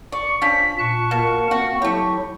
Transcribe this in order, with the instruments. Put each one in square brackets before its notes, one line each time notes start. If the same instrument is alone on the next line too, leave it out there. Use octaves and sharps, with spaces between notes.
[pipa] D5 [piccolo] C#6
[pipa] F3 C#4 D4 [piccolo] B6
[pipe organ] A#2 A5 F#6 [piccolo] C#6
[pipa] B2 [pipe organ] A#3 A#4 A5
[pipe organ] A#3 C4 [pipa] F#4
[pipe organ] F#3 E4 [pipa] A3 G4